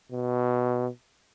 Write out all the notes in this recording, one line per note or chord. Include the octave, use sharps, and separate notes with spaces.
B2